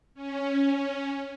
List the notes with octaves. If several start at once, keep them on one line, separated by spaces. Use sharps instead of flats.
C#4